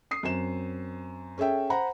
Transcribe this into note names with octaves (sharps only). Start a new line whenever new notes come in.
D#6 C7
F#2 C4 E7
C#4 G#4 A4 E5 G5
C5 F#5 A#5 B5